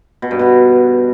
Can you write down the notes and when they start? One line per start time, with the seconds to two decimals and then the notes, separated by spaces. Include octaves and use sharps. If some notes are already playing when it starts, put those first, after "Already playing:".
0.22 B2
0.31 G2
0.39 B2